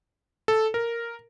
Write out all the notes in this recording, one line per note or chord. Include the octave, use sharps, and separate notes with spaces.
A4
A#4